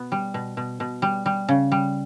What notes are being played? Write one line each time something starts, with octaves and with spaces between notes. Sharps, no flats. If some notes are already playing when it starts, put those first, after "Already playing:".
Already playing: B2 B3
G3
B2
B2
B2
G3
G3
C#3
G3